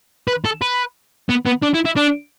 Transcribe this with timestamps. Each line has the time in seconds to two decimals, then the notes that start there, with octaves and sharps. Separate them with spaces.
0.28 B4
0.45 A4
0.62 B4
1.29 B3
1.46 B3
1.62 D4
1.74 E4
1.85 E4
1.96 D4